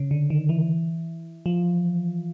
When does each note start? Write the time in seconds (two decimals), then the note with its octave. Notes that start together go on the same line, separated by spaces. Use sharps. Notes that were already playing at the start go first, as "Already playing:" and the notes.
Already playing: C#3
0.11 D3
0.30 D#3
0.49 E3
1.46 F3